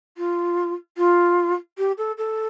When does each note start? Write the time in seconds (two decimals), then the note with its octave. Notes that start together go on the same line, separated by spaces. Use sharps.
0.18 F4
0.97 F4
1.78 G4
1.98 A4
2.18 A4